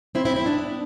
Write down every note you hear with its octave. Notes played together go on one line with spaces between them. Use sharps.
C4 E4
C4 E4
C4 E4
B3 D4